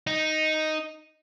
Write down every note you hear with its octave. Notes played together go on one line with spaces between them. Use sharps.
D#4